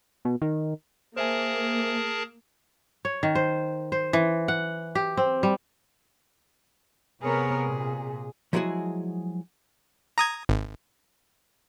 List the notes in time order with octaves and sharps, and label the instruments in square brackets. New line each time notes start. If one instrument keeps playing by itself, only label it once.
[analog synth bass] B2
D#3
[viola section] A#3 [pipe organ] G#4 A#4 A5 [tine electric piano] C5 E5 G#5
[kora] C#5
D#3
C5
C5
E3
F#5
G4
C4
G3
[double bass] C3 [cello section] B3 A#4 C#5 [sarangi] G#4
[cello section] A#2
[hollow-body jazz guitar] F3 F#3 G#3 E4 F#4 G#4
[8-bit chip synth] A#5 D#6 G#6
G#1